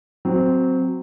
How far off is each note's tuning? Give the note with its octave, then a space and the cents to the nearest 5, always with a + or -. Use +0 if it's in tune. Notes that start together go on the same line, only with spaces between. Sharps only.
F#3 +0 C4 -5